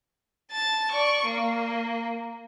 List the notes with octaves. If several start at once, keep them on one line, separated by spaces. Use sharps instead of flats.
A5 A6
D5 C#6
A#3